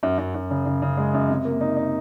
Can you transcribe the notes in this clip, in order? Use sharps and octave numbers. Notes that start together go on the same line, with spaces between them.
F#2
F#2
F#2
C#3
C#3
C#3
G#3
F#2
C3
A#3
D#4
D#4